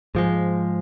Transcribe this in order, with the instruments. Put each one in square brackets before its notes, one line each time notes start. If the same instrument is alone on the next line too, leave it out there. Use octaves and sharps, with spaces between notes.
[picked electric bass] G#2 F3 G#3